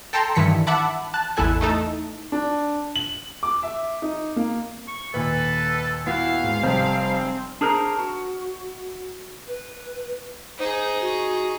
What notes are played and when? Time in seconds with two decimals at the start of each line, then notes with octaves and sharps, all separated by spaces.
0.13 A4 G5 A5 A#5 C6
0.35 G2 D#3 E3 B6 C#7
0.67 E5 F#5 A5 B5 D6
1.14 A5 F#6
1.37 A1 E2 E4 A4 G#5 F#6
1.61 A3 D#4 A4
2.32 D4
2.96 F#7
3.43 D6
3.63 E5
4.02 D#4
4.36 A#3
4.88 C#6
5.14 D#2 A#2 A4 B4
6.07 B3 E4 F#4 F5 F#6
6.44 G#2
6.63 F1 G3 C4 C5
7.61 D4 G#4 A#4 C5 A#5
7.99 F#4
9.47 B4
10.58 D#4 G#4 C5
11.01 F#4